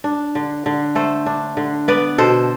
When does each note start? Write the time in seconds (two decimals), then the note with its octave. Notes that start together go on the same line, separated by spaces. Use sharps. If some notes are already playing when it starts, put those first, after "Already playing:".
0.04 D4
0.35 D3
0.66 D3
0.95 A3 A4 C5
1.26 D4
1.57 D3
1.88 B3 B4 D5
2.18 B2 A4 C5